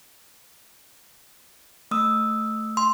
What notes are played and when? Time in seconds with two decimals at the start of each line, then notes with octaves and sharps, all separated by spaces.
1.91 A3 D#6 E6
2.77 C6